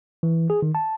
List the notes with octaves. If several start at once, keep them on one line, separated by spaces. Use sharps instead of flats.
E3
G#4
D#3
A5